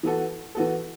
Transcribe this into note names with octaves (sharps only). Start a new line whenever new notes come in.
E3 B3 F#4 A4
E3 B3 F#4 A4